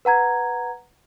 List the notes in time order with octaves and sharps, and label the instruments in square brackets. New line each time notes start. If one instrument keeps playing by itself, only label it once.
[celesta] B4 F#5 A#5 G#6